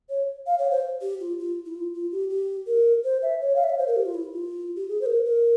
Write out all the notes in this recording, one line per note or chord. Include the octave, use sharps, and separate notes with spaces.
C#5
F5
C#5
C5
G4
F4
F4
E4
F4
F4
G4
G4
A#4
C5
E5
C#5
F5
E5
C#5
C5
A#4
G4
F4
E4
F4
G4
G#4
C5
A#4
A#4